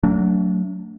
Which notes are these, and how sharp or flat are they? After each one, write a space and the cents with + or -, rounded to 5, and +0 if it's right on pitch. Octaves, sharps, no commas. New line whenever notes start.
F#3 +0 A3 +25 D4 -35